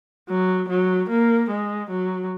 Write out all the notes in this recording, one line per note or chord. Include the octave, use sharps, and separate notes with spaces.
F#3
F#3
A#3
G#3
F#3